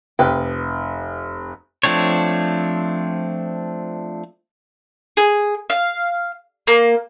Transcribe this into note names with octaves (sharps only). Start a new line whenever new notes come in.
F1 B4 G5
F3 A3 C4 D4 C#5
G#4
F5
A#3